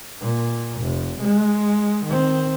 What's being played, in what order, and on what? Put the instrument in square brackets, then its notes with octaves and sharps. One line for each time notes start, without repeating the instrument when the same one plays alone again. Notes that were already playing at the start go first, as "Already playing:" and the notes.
[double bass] A#2
F1
G#3
D#3 C4